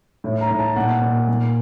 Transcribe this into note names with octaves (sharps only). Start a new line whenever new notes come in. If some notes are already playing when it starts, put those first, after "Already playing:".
A2
A#5
A2
A5
A#2 F#5
A#2
A#2